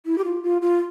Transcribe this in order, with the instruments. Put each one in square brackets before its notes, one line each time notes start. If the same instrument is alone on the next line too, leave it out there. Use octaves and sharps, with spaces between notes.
[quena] E4
G4
F4
F4
F4